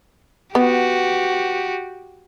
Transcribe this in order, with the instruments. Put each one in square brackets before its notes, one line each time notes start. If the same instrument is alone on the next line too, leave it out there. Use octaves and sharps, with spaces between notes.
[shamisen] B3 [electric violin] F#4 G4